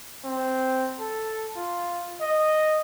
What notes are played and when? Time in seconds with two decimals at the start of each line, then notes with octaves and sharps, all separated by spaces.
0.24 C4
0.99 A4
1.56 F4
2.21 D#5